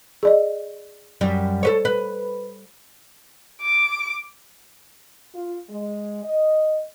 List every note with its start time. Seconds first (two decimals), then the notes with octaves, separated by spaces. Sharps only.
0.23 G#4 D5 D#5
1.21 F#2 G3
1.63 A4 B4 C#5
1.85 B4
3.62 D6
5.34 F4
5.70 G#3
6.24 D#5